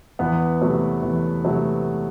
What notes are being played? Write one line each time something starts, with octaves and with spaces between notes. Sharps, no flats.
E2 B3 B4
C3 F#3 A3
E2
C3 F#3 A3